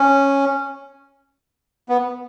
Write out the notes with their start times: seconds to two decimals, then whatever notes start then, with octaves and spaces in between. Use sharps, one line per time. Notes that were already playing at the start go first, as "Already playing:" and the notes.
Already playing: C#4
1.89 B3